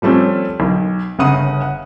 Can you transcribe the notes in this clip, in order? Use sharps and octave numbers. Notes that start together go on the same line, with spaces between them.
F3 G3 A3 C4 C#4
B1
G1 C#3 F#5 D#6 D#7
F#5